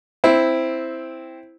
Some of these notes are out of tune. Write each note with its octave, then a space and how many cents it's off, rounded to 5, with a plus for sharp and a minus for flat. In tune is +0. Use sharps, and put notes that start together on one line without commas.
C4 +0 E4 +0